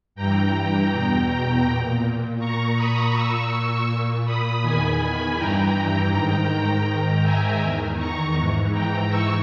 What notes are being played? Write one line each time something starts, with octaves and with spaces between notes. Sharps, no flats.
G2 E3 G5 A#5
E2 B2
A#2
A#2 A#5 C#6
B5 D#6
A#2 C#6 E6
A#2
B5 D#6
E2 D#3 G#5 B5
G2 E3 G5 A#5
G#2 D#3
G#2 D#3 G5 A#5
E5 G#5
E2 D#3
A#5 C#6
G#2 E3
G5 A#5
G#2 E3 C#6 E6